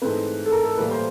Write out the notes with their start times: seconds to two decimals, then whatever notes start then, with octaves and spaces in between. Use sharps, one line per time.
0.02 G#2 E3 A3 C4 B4
0.46 A4
0.52 A#4
0.65 A4
0.77 A2 E3 G3 A#3 B4
0.91 C5